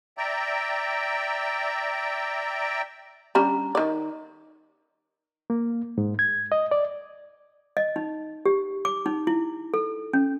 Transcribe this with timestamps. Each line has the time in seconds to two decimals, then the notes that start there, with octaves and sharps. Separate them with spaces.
0.18 D5 E5 G5 A#5
3.35 G3 C#4 D4 A#5
3.75 D#3 D5
5.50 A#3
5.98 G#2
6.19 G#6
6.52 D#5
6.71 D5
7.77 D#5
7.96 D#4
8.46 G4
8.85 D6
9.06 D#4
9.27 E4
9.74 A4
10.13 C#4